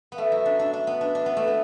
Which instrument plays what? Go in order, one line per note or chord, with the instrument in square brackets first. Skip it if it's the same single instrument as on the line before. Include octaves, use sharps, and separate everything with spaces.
[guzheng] B3
[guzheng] A3 [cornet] E5
[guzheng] F#3
D4
D4
[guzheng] D4 [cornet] E5
[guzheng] B3
D4
D4
B3
A3
B3